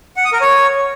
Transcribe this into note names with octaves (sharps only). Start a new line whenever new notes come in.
F#5
D#6
A#4
C#5